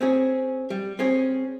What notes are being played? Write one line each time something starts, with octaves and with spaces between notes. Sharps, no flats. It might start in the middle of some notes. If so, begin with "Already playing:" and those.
C4 C#4 G#4
G3
C4 C#4 G#4